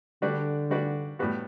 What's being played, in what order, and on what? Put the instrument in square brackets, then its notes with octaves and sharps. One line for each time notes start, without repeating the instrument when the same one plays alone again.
[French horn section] D3 [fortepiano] G3 D4 F#4 B4 D5
[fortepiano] G3 D4 F#4 B4 D5
A2 G3 B3 F#4